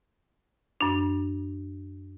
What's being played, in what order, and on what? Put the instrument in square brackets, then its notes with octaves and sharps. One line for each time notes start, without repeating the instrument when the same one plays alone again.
[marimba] F#2 D4